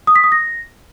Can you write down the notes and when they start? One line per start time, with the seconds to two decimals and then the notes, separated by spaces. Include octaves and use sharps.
0.07 D#6
0.16 B6
0.24 D#6
0.32 A#6